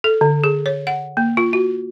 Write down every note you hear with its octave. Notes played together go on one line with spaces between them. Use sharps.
A4
D3
G#4
C#5
F#5
A#3
F4
F#4